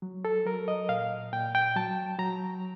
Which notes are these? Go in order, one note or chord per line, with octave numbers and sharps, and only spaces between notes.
F#3
A4
F#3 A#4
D#5
A#2 F5
A#2 G5
G5
F#3 A5
F#3 A#5